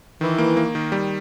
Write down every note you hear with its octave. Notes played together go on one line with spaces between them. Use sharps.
D#3 E3
A#3
A#3
D#3
G3